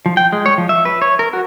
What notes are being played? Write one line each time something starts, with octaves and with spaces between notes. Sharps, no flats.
F3
G5
G#3
C#5
F3
E5
B4
C#5
A#4
F#4